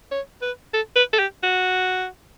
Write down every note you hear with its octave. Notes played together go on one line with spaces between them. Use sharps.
C#5
B4
A4
B4
A4
G4
F#4